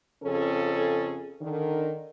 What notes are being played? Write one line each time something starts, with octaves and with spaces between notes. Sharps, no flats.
F2 C#3 C#4 G#4 A4
D3 D#3